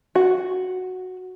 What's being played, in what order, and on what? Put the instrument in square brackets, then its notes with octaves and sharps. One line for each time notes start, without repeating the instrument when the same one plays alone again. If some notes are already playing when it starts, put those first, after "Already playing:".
[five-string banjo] F#4